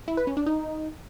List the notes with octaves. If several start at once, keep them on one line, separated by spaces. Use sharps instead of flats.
E4
B4
C#4
D4
D#4